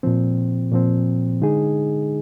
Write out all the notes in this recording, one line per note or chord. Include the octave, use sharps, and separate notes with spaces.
A#2 F3 C4
A#2 F3 C4
D3 G#3 D#4 G#4